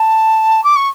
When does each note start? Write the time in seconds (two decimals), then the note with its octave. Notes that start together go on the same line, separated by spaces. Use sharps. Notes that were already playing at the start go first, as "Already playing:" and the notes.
Already playing: A5
0.63 D6
0.75 C#6